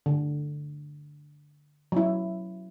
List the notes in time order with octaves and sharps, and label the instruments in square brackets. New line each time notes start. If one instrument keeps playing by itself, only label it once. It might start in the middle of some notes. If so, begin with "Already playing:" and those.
[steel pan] D3
F#3 E4